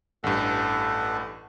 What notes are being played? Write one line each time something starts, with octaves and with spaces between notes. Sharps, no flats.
A1 G2 A4 F#5